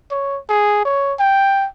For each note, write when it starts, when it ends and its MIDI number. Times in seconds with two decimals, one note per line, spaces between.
0.11 0.39 73
0.49 0.83 68
0.85 1.14 73
1.19 1.66 79